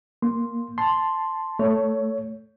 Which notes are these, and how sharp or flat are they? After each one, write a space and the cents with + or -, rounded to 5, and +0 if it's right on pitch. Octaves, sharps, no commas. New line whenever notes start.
A#3 +0 C6 +0
A5 +0 C6 +0
A3 +5 C#5 +15